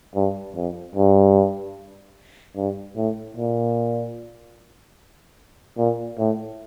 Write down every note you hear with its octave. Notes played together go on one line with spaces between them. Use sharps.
G2
F2
G2
G2
A2
A#2
A#2
A2